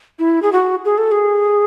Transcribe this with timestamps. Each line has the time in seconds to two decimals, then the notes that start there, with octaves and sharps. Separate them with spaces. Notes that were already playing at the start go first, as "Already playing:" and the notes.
0.19 E4
0.42 G#4
0.52 F#4
0.85 G#4
0.98 A4
1.11 G#4